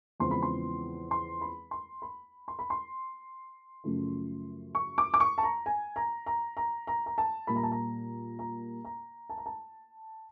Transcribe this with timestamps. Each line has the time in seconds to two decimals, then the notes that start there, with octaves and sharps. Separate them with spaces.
0.20 E2 C#3 F3 G#3 C4 C6
0.31 B5
0.42 C6
1.11 C6
1.41 B5
1.71 C6
2.02 B5
2.48 C6
2.59 B5
2.70 C6
3.84 F#2 C#3 F3 A3
4.75 C#6
4.98 D6
5.14 D6
5.20 C#6
5.38 A5
5.43 A#5
5.66 G#5
5.96 A#5
6.26 A#5
6.57 A#5
6.87 A#5
7.06 A#5
7.18 A5
7.47 A#2 G3 A#3 B5
7.56 A#5
7.63 A5
7.72 A#5
8.39 A#5
8.85 A#5
9.30 A5
9.38 A#5
9.46 A5